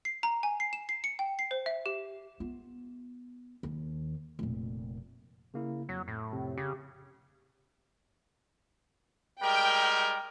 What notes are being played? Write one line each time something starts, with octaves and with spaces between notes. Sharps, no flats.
C7
A#5
G#5
C7
E7
C7
C#7
G5
C7
C5
E5
G4
B3 F4
D#2
F1 A#2
C#3 A#3 E4
F2 F#3
A2
F2 C3
C#3 G4
G3 G#3 A#4 G5